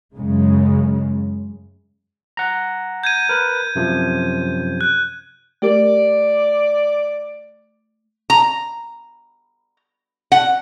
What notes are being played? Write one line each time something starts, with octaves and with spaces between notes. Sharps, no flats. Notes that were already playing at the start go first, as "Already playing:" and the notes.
F#2 C#3 G#3
F#5 A#5
G6 G#6 D#7
A#4 B4
F#2 C3 F3
F#6
A3 G4 A#4 D5
A#5
F#5